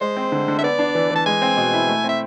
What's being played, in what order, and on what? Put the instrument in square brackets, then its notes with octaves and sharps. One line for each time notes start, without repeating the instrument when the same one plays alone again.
[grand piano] G#3 [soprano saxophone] C5
[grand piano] C4
D3
D3
[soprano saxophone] E5
[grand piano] B3 [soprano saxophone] D5
[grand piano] D4
E3
[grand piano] E3 [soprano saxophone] A5
[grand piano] G#3 [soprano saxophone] G#5
[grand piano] C4
B2
E4
A3
[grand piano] C4 [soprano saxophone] E5